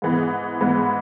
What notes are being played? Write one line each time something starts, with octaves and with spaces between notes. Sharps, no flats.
G#2 E3 G#3 B3
G#2 E3 G#3 B3